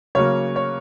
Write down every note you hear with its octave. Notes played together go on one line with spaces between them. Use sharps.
C#3 F#3 A#3 C#5
C#5